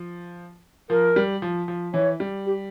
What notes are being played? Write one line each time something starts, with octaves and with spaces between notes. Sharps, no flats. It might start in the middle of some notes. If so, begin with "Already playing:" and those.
Already playing: F3
F3 A#4
G3
F3
F3
E3 C#5
G3
G4